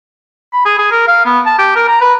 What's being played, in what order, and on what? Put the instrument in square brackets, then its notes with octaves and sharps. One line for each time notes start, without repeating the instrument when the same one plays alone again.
[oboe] B5
G#4
G#4
A#4
F5
B3
A5
G4
A#4
A#5
B4